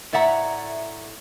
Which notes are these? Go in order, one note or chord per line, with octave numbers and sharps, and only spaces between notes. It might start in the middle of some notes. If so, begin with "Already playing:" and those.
A2 D5 E5 F#5 A#5